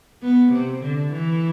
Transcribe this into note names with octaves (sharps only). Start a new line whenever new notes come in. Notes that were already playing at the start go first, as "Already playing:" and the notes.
B3
C3
D3
E3